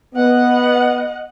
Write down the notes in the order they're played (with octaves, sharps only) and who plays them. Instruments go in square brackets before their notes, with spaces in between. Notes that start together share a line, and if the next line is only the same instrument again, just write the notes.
[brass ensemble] B3 [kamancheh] D#5 F#5